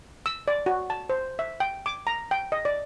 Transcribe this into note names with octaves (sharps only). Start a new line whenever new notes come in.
E6
D5
F#4
A5
C5
E5
G5
D6
A#5
G5
D#5
D5